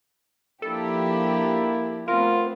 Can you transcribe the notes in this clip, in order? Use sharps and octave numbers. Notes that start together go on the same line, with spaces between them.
F3 A#3 D4 E4 G4 A4
A3 B3 C4 F4 A#4